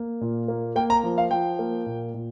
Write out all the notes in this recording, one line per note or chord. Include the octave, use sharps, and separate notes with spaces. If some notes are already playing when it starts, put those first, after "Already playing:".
Already playing: A#3
A#2
A#3
A#3 G5
A#5
F3
F5
F3 G5
A#3
A#2
A#2